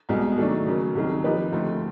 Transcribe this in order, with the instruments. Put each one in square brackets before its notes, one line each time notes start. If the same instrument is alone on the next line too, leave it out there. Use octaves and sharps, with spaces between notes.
[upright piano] C2 B2 G#3
D#3 F#3 A3 D4
C#3 F#3 A#3
C2 C3 D#3 F#3
F3 A#3 D#4 G4 B4
D2 C3 F3 A3 C4